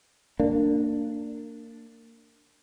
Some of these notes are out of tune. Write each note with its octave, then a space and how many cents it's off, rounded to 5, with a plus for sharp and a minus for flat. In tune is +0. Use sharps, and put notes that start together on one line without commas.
A#3 -25 D4 +0